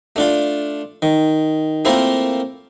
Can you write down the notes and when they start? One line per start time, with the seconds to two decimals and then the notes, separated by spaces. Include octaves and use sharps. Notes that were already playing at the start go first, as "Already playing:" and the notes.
0.16 A3 D4 F4
1.02 D#3
1.85 A3 A#3 C4 E4 F4 A#4